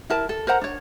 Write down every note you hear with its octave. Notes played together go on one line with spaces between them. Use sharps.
E4 A#4 A5
A4
A#4 C5 F#5 A#5
D4 C#5